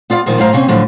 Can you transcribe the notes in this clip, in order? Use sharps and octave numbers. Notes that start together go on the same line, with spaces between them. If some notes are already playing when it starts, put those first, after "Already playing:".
B3 F4 D5 E5 F5
A#2 D#3 F3 A#3
F#2 A2 C5 F5 A#5
C3 A#3 C4 C#4
A2 D3 F3 F#3